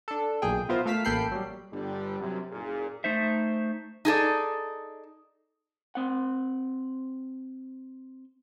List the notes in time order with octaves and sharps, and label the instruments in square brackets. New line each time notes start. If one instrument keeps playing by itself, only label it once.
[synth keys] D4 A4
B1 A#2 G#4 G5
B3 E4 F4 A#4 C5
A3 A#4 F5 E6 B6
A1 A#3 A4 G5 B5 C7
F#3 G3
[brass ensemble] G1 D3 G3
F#2 C3
F#1 A#2 G#4
[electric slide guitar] A3 D#4 C5 E5
[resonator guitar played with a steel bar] D#4 G#4 A4 D5
[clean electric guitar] C4 F#5